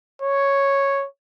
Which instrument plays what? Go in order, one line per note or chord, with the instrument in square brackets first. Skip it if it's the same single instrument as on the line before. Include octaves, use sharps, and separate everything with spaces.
[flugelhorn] C#5